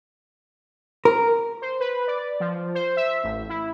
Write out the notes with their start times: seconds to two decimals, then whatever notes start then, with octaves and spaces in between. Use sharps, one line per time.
1.05 A#4
1.62 C5
1.80 B4
2.07 D5
2.40 F3
2.75 C5
2.97 E5
3.24 A1
3.49 E4